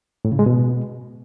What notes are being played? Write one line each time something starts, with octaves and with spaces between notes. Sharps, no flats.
A2
C#3
G#3
B2